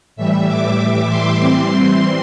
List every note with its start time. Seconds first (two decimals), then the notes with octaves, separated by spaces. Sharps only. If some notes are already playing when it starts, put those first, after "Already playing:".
0.16 A2 E3 G3 E5
0.48 D6
0.78 D6
1.08 C6
1.40 E3 G3 C4